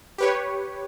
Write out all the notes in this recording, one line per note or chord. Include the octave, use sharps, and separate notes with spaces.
G4 B4 C#5